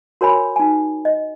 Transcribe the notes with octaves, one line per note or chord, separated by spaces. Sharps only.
F#4 A#4 C#5 G#5 B5
D#4 G#5
D#5